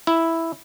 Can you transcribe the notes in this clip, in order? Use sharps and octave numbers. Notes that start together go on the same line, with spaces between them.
E4